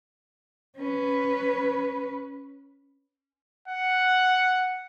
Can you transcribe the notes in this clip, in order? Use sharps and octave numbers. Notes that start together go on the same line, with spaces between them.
C#4 B4
F#5